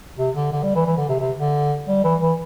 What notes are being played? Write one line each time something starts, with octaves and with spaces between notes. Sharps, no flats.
C3
D3
D3
G3
E3
E3
D3
C3
C3
D3
G3
E3
E3